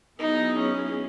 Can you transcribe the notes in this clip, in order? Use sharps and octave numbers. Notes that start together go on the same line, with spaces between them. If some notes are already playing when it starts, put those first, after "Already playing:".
F#3 B3 D#4 E4 G#4
C#4